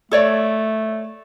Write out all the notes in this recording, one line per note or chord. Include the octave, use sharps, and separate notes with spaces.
A3 A4 C#5 D5